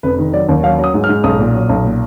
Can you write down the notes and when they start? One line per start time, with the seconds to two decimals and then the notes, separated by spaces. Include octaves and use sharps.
0.03 F1 B4
0.19 D#3
0.33 F#3 D5
0.49 D#2
0.64 F#3 F5
0.78 F#3
0.84 D#6
0.94 G#2
1.04 F6
1.09 G#2
1.24 B1 D#6
1.39 A#2
1.54 F#3
1.69 B1
1.84 A#2